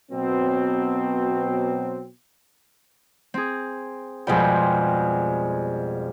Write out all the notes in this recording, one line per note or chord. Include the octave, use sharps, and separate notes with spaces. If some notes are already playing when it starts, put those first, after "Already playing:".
B2 F#3 C4
C4 G#4
F2 B2 G3 G#3 G5